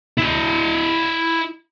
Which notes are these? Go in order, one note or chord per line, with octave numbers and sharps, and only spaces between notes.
E4 D#5